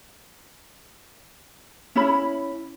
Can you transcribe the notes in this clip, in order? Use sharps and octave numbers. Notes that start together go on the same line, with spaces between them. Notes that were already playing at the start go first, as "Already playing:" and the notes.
C#4 E4 B5